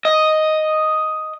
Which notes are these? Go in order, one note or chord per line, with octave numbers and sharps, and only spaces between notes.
D#5